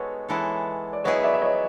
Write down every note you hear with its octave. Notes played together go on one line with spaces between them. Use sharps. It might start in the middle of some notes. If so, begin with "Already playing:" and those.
Already playing: G#3 B3 D#4 F#4 A4 C#5
E3 G#3 B3 E4 A4
D5
F#3 B3 E4 G#4 C#5 D#5
D5 E5
E5
C#5 D#5